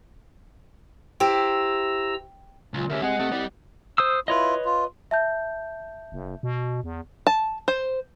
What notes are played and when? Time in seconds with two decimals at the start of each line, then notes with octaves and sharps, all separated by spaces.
1.20 E4 G4 C5 G5 A#5 E6
2.74 C#2 A#2 F#3
2.89 D2 C#4 G4 A#4 E5
3.02 C3 G#3 G#4 D#5 F#5
3.20 C3 A3
3.32 C2 G3 D5
3.98 C5 D#6 E6
4.28 E4 F4 B4 C#5 D#5
4.65 F4
5.11 E5 A5 G6
6.12 F#1
6.43 B2
6.84 E2
7.27 A5
7.68 C5